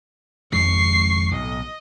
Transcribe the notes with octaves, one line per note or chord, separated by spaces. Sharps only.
G#1 F2 G#3 C#6 C7
B1 A2 D#5